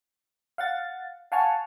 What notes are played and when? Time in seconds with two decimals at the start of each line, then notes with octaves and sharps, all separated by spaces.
0.58 F5 F#5 A6
1.32 F5 F#5 G#5 A5 C#6 F6